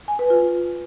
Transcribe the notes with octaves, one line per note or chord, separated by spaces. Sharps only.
G#5
B4
F4